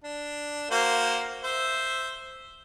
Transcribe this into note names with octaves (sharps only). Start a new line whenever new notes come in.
D4
A#3 F#4 C5
C5 E5